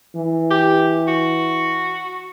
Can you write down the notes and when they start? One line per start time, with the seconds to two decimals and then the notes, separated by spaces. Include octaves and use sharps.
0.16 E3
0.50 G4
1.08 F#4